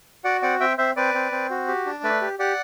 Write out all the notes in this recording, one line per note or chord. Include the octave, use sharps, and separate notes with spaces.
F#4 D5 F#5
C4 D5 F#5
C4 E5 G5
C4 C5 E5
C4 B4 D5
C4
C4
F#4
G4
D4
A3 B4 D5
G4
G4 D5 F#5